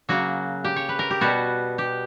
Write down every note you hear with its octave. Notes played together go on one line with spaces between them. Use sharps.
C#3 F#3 A#3 F#4
G4
C#5
B4
A#4
G4
B2 G3 B3 F#4
G4